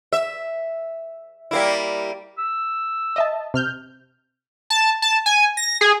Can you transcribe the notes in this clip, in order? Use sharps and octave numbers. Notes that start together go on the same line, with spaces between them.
E5
G3 A#3 E4
E6
D#5 E5 A5
C3 F6 G6
A5
A5
G#5
A#6
G#4